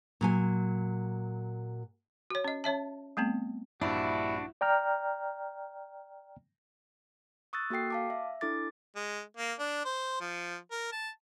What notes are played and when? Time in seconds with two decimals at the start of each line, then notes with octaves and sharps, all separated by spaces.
0.21 A#2 F#3 G#5
2.30 F#4 C#5
2.44 C#4 D#5
2.64 C#4 C#5 E5 A5
3.17 G3 A3 B3 C4
3.81 A#1 G2 G3 D4 E4 F#4
4.61 D5 G5 A#5 F6
7.53 C#6 D#6 E6 F#6 A6
7.70 A#3 F#4 A4 G5 C7
7.90 F5 A5 D6
8.10 E5
8.41 D4 E4 A4 D6 A6
8.96 G#3
9.37 A#3
9.59 D4
9.85 C5
10.21 F3
10.71 A#4
10.92 A5